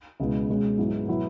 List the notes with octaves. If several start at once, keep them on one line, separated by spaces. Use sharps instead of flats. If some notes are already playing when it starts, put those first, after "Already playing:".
C#2 B2 G#3 B3 E4
B2 G#3 C#4
G#2 F#3 B3 E4
B2 F#3 B3 E4